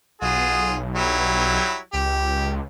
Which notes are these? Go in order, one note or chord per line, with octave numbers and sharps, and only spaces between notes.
B1 F4 F#4 G#4
F#3 G3 E4
C#2 G4